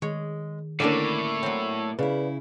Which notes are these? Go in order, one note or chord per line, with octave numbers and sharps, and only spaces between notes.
D#3 G#3 C#5
A2 D3 A#3 C#4 D4 E4 D5
F#3 C4 C#5
C#3 E4 B4 D5 F5